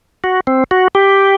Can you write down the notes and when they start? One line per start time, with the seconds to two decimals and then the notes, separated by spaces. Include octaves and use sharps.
0.24 F#4
0.47 C4
0.71 F#4
0.95 G4